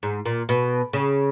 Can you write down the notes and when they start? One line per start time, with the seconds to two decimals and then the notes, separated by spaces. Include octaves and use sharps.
0.03 G#2
0.25 A#2
0.49 B2
0.93 C#3